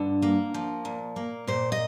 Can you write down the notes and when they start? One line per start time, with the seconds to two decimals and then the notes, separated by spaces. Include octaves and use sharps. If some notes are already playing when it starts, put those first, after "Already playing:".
Already playing: G2 D3
0.22 A#3
0.54 F3
0.85 A#2
1.16 A#3
1.47 A#2 C5
1.72 D#5